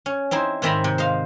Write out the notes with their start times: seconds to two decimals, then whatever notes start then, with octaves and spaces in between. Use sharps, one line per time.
0.06 C#4
0.31 C4 D#4 E4 C5
0.62 G#2 D#3 C4 E5 A#5 B5
0.84 C3
0.98 C5 D#5 F5